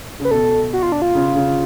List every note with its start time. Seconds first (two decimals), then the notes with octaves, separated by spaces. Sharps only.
0.20 C#3
0.25 B4
0.31 B2 A4
0.73 F#4
0.83 F4
0.92 D4
1.02 F4
1.15 C#3
1.36 C#3